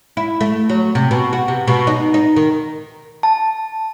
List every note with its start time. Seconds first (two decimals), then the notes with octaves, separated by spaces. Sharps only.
0.17 E4
0.41 A3
0.69 F#3
0.95 C3
1.11 B2
1.33 F#4
1.48 C3
1.67 B2
1.87 D#4
2.14 D#4
2.36 D#3
3.23 A5